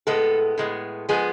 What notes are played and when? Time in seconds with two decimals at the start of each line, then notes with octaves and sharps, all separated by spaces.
0.07 A2 G#3 B3 A4
0.58 A2 G#3 B3
1.09 F3 G#3 B3 G#4